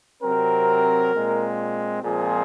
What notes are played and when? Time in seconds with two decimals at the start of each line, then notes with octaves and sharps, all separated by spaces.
0.23 C3 F#3 C4 A#4
1.14 A#2 G#3 C4
2.04 A#2 F3 G#3 C4 G#4